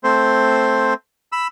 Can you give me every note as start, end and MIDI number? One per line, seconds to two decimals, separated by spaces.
0.04 0.94 57
0.04 0.94 60
0.04 0.94 72
1.32 1.47 83
1.32 1.47 88